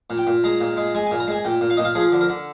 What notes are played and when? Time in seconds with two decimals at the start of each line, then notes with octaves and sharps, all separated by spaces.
0.10 A#2
0.18 G5
0.27 A#2
0.44 G#3 A#5
0.61 A#2
0.77 G#3
0.95 G#3 G#5
1.07 G#5
1.11 A#2
1.20 A#5
1.27 G#3 G#5
1.44 A#2 G5
1.61 A#2
1.70 F5
1.77 A#2 D#5
1.84 F5
1.95 F3 G#4
2.12 D3
2.21 A#4
2.29 D3